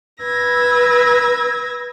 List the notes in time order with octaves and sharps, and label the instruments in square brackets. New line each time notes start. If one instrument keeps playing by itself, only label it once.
[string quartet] B4 E6 G#6 A#6